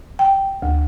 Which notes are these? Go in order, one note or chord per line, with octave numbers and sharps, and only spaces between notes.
G5
D2